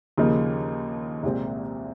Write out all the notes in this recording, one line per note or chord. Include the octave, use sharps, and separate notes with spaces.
D#2 C#3 F3 A#3 D#4
C2 A#2 G#3 C4